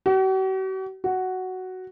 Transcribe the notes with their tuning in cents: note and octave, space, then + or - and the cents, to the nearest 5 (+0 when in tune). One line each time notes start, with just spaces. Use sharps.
F#4 +45
F#4 +5